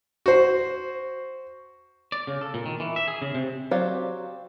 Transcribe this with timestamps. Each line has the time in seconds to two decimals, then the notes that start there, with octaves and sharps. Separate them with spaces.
0.26 F#4 C5
2.12 D5
2.27 C#3
2.41 A4
2.54 A#2
2.66 D#3
2.80 E3
2.96 E5
3.08 G#4
3.22 C#3
3.34 C3
3.71 F#3 C4 G4 D5 F5